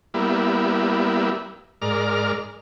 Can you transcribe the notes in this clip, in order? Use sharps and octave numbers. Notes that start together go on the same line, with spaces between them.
G3 A#3 B3 E4
G#2 A#4 D5 F6